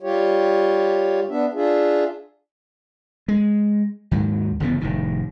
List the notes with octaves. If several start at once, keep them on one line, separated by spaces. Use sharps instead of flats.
G3 F4 G4 C#5
B3 D4 E5
D4 F4 G#4 E5
G#3
D#2 G#2 F#3
G1 C#3 E3 B3
F1 A2 D#3